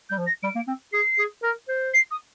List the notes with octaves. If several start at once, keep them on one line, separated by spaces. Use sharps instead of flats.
G3 G6
F3
A#6
G3 D7
A#3
C4
G#4 C7
G#4
A#4
C5
C7
D#6